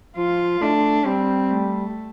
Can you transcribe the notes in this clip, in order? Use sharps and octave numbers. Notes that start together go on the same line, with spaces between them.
F3 F4
A3 D4
G3 C4
A3